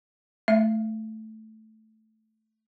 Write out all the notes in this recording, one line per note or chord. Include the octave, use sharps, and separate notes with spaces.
A3 E5